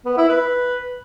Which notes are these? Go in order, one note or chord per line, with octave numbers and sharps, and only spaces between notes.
B3
E4
B4